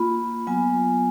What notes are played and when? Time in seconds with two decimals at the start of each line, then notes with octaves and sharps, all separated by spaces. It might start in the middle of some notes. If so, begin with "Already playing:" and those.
Already playing: A#3 F4 B5
0.47 F#3 B3 F4 G#5